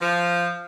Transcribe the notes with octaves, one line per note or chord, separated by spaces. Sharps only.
F3